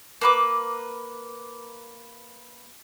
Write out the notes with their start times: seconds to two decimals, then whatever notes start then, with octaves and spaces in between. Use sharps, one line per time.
0.21 A#3 B4 D6